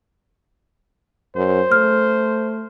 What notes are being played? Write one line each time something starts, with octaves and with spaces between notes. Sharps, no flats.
F#2 C5
A3 F6